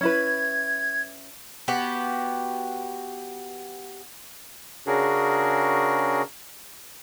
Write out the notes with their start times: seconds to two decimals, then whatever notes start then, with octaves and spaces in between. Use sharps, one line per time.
0.01 C#4 E4 B4 G#6
1.68 B3 F#4 G4
4.87 C#3 C#4 D4 F#4 G#4 A#4